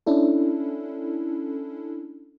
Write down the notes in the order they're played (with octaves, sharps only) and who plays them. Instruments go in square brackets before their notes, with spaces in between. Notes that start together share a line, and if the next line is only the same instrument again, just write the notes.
[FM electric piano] C#4 D4 E4 A4